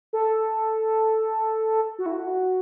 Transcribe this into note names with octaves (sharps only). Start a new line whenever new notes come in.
A4
F#4
E4
F#4